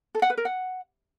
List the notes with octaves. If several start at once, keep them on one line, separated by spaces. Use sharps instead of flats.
A4
F#5
B4
A#4
F#5